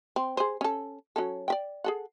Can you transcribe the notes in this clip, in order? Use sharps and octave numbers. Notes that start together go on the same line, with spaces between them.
C4
G#4 C5
C#4 A4
F#3 C#4 A4
D5 E5 G5
G#4 A4 F#5